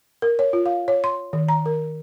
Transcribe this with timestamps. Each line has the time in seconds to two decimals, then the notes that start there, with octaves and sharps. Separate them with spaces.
0.22 A#4
0.39 C#5
0.53 F4
0.66 F5
0.88 C#5
1.04 C6
1.33 D#3
1.49 A#5
1.66 A#4